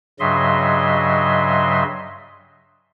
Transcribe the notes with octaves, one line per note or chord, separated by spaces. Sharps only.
G2 C#3 F#3 D#5 E5 C6